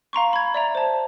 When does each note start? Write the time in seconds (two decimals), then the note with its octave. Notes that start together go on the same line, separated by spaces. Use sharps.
0.13 F5 A#5 C6 C#6
0.33 B5 G#6
0.54 D5 E5 A#5
0.75 C5 A5